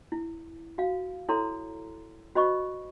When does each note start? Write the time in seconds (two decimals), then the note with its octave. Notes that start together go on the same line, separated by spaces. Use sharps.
0.12 E4
0.78 F#4 F5
1.29 E4 A4 C#5 A#5 C6
2.35 F#4 C5 D#5 B5 C#6